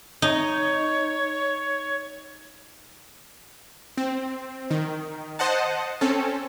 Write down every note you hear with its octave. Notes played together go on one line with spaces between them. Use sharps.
D#4 C#5
C4
D#3
C5 D#5 F#5 A5
C4 C#4 A4